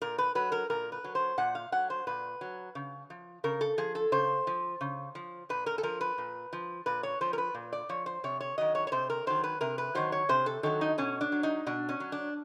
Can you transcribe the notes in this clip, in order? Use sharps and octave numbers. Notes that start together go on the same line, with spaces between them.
A#2 A#4
B4
F#3 B4
A#4
A#2 A#4
B4
F#3
C5
A#2 F#5
F5
F#3 F#5
C5
A#2 B4
F#3
C#3
F3
C#3 A#4
A4
F3 G#4
A4
C#3 C5
F3
C#3
F3
A#2 B4
A#4
A4
F3 A#4
B4
A#2
F3
A#2 B4
C#5
F3 C5
A#4
B4
A#2
D5
F3 C#5
C5
C3 C#5
C#5
D#3 F#3 D#5
C#5
C#5
C3 C5
A#4
D#3 F#3 C5
B4
C3 A#4
B4
D#3 F#3 C5
C#5
C3 C5
A4
D#3 F#3 A4
D#4
B2 C#4
D4
F#3
D#4
B2 D4
C#4
F#3
D4